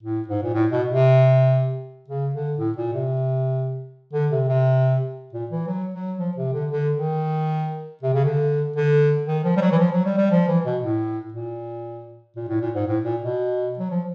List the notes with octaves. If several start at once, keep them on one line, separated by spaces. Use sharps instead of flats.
A2
G#2
A#2
A2
B2
C3
C#3
D3
A2
A#2
C3
D3
C3
C3
A#2
E3
F#3
F#3
F3
C3
D3
D3
D#3
C3
C#3
D3
D3
D#3
F3
G3
F#3
E3
F3
F#3
G3
G3
F3
E3
B2
A2
A#2
A#2
A2
A#2
G#2
A2
A#2
B2
F#3
F3